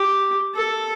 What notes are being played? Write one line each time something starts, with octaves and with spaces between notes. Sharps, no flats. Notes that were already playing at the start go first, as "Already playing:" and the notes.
Already playing: G4
A4